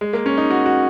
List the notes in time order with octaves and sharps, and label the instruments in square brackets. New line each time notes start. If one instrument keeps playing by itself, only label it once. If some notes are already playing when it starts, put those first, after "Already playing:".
[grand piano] G#3
A#3
C#4
D#4
F#4
F#4